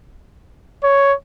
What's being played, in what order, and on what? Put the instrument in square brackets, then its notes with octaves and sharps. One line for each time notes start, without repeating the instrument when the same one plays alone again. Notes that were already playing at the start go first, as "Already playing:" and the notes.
[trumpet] C#5